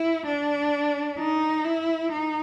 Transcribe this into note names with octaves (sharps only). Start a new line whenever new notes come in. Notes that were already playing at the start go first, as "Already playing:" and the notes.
Already playing: E4
D4
D#4
E4
D#4